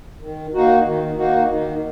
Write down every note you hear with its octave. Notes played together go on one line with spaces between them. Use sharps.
D#3
A#3 D#4 F#4
D#3
A#3 D#4 F#4
D#3